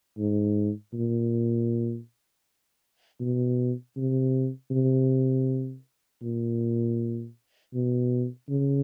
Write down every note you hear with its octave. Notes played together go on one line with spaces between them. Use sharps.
G#2
A#2
B2
C3
C3
A#2
B2
C#3